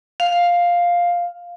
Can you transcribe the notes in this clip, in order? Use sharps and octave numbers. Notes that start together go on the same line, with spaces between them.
F5